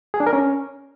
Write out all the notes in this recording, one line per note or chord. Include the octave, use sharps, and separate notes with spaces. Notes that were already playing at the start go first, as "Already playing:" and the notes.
G#4
D4
A#4
C#4